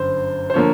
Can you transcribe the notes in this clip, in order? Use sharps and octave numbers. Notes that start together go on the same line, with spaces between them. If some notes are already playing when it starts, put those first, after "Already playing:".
Already playing: G1 F#2 D3 C5
C5
D3 F3 A#3 C#5